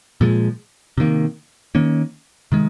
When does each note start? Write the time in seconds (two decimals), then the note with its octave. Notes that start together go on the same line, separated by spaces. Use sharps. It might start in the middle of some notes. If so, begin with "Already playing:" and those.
0.21 A#2 F3 G#3
0.98 C3 D#3 A#3
1.75 D#3 A#3 C#4
2.52 C3 D#3 G#3